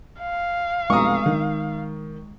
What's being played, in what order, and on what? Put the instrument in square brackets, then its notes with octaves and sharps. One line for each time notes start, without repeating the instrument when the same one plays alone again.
[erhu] F5
[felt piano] F1 B1 A#5 [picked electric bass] G#3 [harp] C#6 D#6
[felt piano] D#3